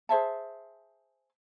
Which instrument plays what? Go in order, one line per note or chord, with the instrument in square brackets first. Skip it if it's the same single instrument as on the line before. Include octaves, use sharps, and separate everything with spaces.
[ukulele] G#4 C5 E5 A5